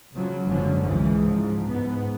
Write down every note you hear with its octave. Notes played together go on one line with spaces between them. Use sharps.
C#3 F3 F#3
F#1 G#2 D3 F3 F#3 C#4
C#2 G#2 E3 F3 G#3
G#2 F3
G#2 B3